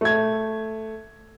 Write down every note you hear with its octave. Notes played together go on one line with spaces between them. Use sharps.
A3 G#6